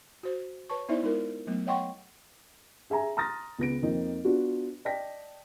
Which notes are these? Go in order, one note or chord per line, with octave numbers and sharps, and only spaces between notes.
F#4 C5
B4 C#5 A5 C#6
B3 D#4 E4 C5 D5 E5
G#3 D#4 F4 A#4
F#3 A3 B3
C#5 D#5 F#5 G5 C6 C#6
G#4 E5 G#5 A#5
A#5 C6 D#6 F6 A6 A#6
C#2 B3 A#6 D7
F2 A#3 C4 D#4
B3 D4 F4 F#4
D5 D#5 G5 A5 A#6 B6